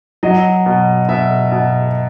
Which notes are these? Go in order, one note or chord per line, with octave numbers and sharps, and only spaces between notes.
F#3 D#5
B2
B2 E5
B2